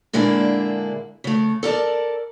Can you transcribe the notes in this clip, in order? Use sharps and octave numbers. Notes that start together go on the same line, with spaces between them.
A#2 D3 G#3 A#3 D4 E4
C#3 A3
A4 A#4 D5 A5